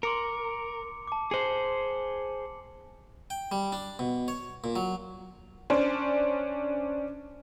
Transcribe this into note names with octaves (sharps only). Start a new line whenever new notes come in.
A#4 C6 D6 C#7
A5 D6
G#4 C5 C#7 F#7
G5
G3
D4
B2
C#5
A#2
F#3
C#4 D4 C5